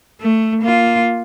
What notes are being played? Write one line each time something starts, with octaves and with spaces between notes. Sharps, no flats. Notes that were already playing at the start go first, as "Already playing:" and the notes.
A3
A#3 F4